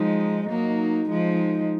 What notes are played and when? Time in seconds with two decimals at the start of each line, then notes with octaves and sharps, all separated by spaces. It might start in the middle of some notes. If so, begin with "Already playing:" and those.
Already playing: F3 G#3 D#4
0.50 F#3 A#3
1.10 F3 G#3